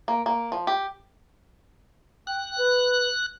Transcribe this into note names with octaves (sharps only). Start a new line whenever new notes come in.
A#3
A#3
F3
G4
G5 F#6
B4